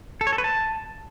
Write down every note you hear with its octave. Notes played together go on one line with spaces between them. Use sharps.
A4
C#5
A4
B4
A5